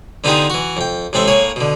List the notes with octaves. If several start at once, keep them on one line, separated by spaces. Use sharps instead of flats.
D3 B3 D#4 F4 G4 G#4
E3 F#4
F2 G5
A1 G#3 C4 A4 E5
A2 A#3 G#4 C#5
B2 D3